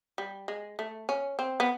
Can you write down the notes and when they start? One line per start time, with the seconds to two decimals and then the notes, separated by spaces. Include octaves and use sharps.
0.18 G3
0.48 G#3
0.79 A3
1.09 C#4
1.39 C4
1.60 B3